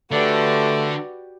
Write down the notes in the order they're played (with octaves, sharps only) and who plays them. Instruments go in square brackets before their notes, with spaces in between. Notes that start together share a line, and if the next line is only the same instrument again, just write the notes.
[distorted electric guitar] D3 [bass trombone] A3 [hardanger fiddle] F#4 G4 [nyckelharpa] B4 D5